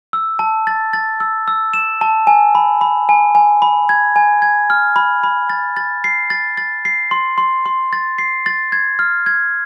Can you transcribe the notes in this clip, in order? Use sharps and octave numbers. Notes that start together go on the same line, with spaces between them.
E6
A5
A6
A6
E6
E6
E7
A5
G#5
B5
B5
G#5
G#5
B5
G#6
G#5
G#6
F6
B5
B5
A6
A6
C7
A6
A6
C7
C6
C6
C6
A6
C7
A6
G#6
F6
G#6